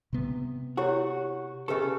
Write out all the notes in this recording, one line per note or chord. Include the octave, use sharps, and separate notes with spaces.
C3 B3
E4 F#4 G4 C#5
C#3 G4 A4 B4 D#5